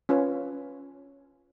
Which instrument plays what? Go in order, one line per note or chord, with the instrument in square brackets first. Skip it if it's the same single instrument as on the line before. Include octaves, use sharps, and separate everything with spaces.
[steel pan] C#4 F4 B4 C#5